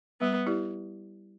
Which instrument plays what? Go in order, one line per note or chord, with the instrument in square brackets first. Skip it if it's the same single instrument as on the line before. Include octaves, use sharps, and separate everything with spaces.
[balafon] G3 [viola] B3
[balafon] E4 G4 D5